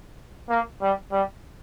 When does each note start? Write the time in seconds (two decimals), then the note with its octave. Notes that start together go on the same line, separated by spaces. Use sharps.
0.50 A#3
0.82 G3
1.12 G3